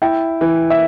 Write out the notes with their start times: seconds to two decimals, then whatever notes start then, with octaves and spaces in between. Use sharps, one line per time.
0.02 E4 G5
0.41 E3
0.70 E5